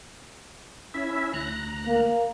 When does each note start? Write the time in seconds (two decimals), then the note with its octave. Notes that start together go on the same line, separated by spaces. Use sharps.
0.94 C#4 E4 E5
1.34 D2 A#5 F#6
1.86 A#3